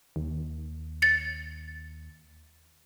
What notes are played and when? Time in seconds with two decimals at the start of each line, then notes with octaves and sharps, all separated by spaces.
0.16 D#2
1.02 A6 C#7